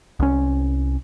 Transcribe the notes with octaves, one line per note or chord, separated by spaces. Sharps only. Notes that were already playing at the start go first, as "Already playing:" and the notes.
C2 C#4